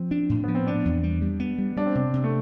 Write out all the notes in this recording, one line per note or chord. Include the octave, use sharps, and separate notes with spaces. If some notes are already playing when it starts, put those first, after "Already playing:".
Already playing: F3 C4
D4
A2
F3 B3
C4
B3 D4
E2
G3
G3
B3
G3
G3 D4
C4
C3 D4
C3
A3